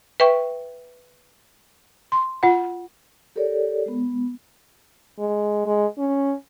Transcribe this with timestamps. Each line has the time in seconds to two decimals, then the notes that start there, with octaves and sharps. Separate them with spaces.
0.20 B4 E5 G5 C#6
2.12 C6
2.43 F4 F#5
3.36 G4 A4 A#4 C#5 D5
3.86 G#3 B3
5.19 G#3
5.66 G#3
5.98 C#4